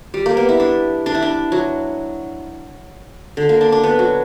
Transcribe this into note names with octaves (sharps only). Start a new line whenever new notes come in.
G3
A#3
B3
E4
D4
D4
E4
D4
F#3
D3
A#3
D4
D4
B3
F#3